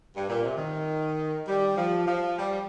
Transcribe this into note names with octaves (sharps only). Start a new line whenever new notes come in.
G2
A#2
C3
D#3
G3
F3
F3
G3